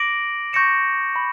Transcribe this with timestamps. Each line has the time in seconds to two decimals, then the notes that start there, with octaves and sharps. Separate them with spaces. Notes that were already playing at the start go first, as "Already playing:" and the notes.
Already playing: D6 A#6 D7 F#7
0.53 C#6 G6 A#6 C#7 E7
1.16 B5